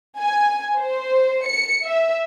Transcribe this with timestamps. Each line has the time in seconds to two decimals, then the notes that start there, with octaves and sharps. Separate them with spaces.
0.18 G#5
0.78 C5
1.47 C#7
1.85 E5